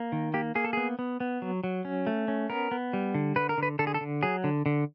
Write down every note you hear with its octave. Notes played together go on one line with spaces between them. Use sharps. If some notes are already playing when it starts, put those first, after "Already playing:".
Already playing: A#3
D#3
A#3 G4
A#3 G#4
A4
B3 G#4
B3
B3
F#3
F#3
C#4
A3
C#4
B3 A#4
B3
G3
D3
D3 B4
A#4
D3 B4
D3 A4
G#4
A4
D3
F#3 G#4
D3
D3